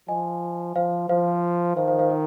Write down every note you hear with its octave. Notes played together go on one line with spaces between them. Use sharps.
F3 D#5 G#5
F3 C5 F5
F3 C5 F5
D#3 C5 F5
C5 F5
C5 F5
A#4 D#5